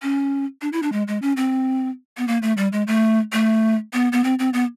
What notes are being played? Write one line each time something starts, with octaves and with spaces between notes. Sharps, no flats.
C#4
D4
E4
D4
G#3
G#3
C#4
C4
B3
A#3
A3
G3
G#3
A3
A3
B3
B3
C4
C4
B3